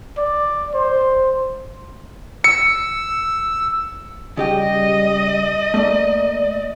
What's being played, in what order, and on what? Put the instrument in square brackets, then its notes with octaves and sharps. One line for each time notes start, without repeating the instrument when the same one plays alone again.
[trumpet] D5
C5
[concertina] E6 [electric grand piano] C#7
[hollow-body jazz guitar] C#3 G4 G5 [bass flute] G3 [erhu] D#5
[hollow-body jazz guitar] A3 A#3 [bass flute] D5